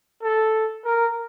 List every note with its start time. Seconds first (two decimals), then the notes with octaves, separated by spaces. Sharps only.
0.23 A4
0.85 A#4